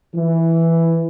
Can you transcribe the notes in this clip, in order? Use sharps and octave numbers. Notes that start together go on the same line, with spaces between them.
E3